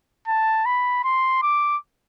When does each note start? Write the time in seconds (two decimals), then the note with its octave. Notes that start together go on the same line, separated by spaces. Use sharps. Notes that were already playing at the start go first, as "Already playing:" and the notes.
0.28 A5
0.66 B5
1.04 C6
1.42 D6